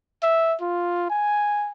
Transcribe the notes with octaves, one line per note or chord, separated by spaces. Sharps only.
E5
F4
G#5